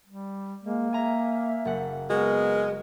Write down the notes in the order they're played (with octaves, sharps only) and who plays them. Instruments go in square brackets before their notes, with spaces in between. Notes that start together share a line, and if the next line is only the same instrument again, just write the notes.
[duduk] G3
[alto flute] G#3 [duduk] A#3
[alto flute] E5 [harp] G#5 A#5
[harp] F#1 F#5
[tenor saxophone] G#3 [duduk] B3 [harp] F#4 [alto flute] A#4